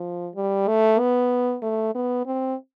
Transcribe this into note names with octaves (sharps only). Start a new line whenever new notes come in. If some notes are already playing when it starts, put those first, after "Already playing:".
Already playing: F3
G3
A3
B3
A3
B3
C4